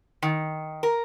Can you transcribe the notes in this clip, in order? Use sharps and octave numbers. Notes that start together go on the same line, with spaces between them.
D#3
A#4